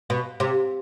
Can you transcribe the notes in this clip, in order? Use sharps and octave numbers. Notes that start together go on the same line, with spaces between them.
B2
C3